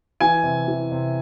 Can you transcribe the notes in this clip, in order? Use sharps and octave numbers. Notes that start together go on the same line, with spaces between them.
E3 G#5
C3
E3
C3